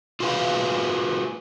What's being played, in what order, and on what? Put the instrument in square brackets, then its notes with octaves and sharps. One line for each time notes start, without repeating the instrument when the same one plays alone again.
[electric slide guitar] F4 F#4 G#4 B4 F5